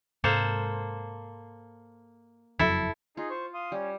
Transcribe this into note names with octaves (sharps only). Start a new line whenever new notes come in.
G#2 C3 G#3 A#3 A4 C5
F#1 F2 F#3 E4 A4
D#4 F4 G#4
C5 C#6
F5 C6 D#6
G3 C#4